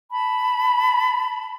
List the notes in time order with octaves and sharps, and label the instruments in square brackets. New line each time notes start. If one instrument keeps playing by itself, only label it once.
[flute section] A5 B5